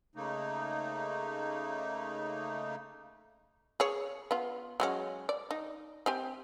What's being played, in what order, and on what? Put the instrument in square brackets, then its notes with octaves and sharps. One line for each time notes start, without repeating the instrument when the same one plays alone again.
[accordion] C#3 A3 A#3 D#4
[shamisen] G#4 C#5
B3 F4
F#3 G#3 C#4
D5
D#4
C4 G4 G#5